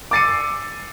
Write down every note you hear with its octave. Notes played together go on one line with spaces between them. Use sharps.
D6 E6 A6 C7 C#7 D#7